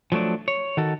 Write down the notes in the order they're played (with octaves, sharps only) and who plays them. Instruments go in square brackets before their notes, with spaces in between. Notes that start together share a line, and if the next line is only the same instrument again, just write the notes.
[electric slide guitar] F3 F#3 A3 D4
C#5
D#3 F#4 A4